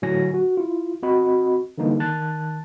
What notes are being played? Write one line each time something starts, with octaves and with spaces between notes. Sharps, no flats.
A2 D3 F#3 G#5 A#6
F#4
E4 F4
G#1 C4 F#4 D#5 B5
D3 E3 G3 A#3 D4 D#4
D#3 A5 F#6 A6